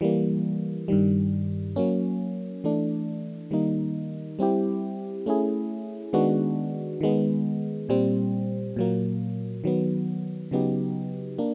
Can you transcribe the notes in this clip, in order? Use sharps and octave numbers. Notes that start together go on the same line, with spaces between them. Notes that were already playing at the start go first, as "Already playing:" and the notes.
E3 G3 A#3
G2 D#3 G3
F#3 A#3 C#4
E3 A3 D4
D#3 G3 A#3 D#4
G3 C4 E4 G4
A3 C#4 E4 G#4
D#3 G#3 B3 D4 F#4
D#3 G#3 B3
A#2 G3 C4
A#2 F#3 A#3
D#3 F#3 B3
C#3 F#3 B3 D#4 G4
A#3 D4